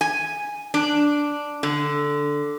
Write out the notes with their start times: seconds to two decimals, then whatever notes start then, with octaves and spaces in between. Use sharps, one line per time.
0.01 G#5
0.74 D4
1.63 D3